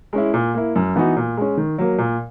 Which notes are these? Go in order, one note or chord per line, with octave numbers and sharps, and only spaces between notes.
G#3 C#4 E4
A#2
A#3 E4
F#2
E3 B3 D#4 F#4
A#2
G#3 C#4
D#3
F#3 A#3
A#2